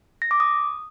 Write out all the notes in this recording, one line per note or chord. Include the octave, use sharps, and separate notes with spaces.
A#6
D6
D#6